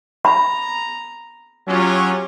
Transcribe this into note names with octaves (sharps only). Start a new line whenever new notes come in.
A#5 B5
F#3 C#4 F4 G4